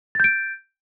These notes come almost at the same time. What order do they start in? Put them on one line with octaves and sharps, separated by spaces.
A6 G6 D7